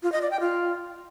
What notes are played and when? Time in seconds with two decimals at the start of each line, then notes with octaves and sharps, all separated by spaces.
0.03 F4
0.12 D#5
0.22 D5
0.31 G5
0.40 F4